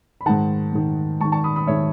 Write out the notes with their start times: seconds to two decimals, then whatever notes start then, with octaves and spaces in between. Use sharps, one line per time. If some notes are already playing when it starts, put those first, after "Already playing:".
0.21 B5
0.26 G#2 D#3 F#5 A5
0.73 G#2 D#3
1.20 G#2 A5 C#6
1.25 D#3
1.32 A5 C#6
1.44 B5 D#6
1.56 B5 D#6
1.67 G#2 D#3 C#5 E5